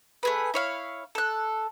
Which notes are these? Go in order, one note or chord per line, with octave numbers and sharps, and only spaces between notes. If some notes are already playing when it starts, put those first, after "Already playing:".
A3 G#4 B4
E4 C#5 F5
A4 F#6